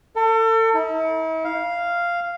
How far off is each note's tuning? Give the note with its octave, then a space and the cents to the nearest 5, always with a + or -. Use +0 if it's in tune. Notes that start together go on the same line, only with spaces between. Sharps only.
A4 +35
E4 -45
F5 -5